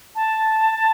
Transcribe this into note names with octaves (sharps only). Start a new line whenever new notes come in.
A5